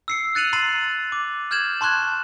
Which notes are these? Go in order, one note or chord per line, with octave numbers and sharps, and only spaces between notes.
E6 C7 C#7
F#6 A6 C#7 D#7 F7 F#7
A#5 C6 A6 C7 D#7 F#7
D6
F6 G6 G#6 E7 F#7
A5 C6 C#6 F#6 G#6